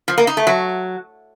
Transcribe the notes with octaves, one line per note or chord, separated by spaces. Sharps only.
F3
A#3
D#4
A3
F#3